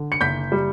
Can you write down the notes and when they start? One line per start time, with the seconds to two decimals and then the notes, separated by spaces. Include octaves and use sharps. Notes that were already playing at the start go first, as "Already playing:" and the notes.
Already playing: D3
0.12 C#7
0.21 F#1 G6 B6
0.52 G3